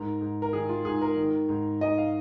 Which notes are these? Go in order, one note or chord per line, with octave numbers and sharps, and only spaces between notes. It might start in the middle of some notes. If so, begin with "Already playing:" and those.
Already playing: G#2 A#4
G#2
A#4
D#3 G#4
F4
G#2 G#4
A#4
D#3
G#2
G#2 D#5
F5